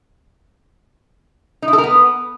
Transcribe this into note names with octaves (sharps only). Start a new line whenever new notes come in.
D#4
E4
A4
A#4
B3